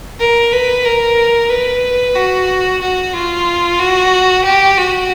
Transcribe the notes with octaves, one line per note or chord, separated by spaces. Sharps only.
A#4
B4
A#4
B4
F#4
F#4
F4
F#4
G4
F#4